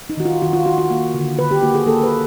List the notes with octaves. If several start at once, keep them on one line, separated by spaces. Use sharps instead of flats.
D#4
D#3 F#4
F4
D#3 F#4
F4
D#3 F#4
F#4
A#3
D3
D3 B4
G4
A#3 F#4
G#4
A#3 A4
B4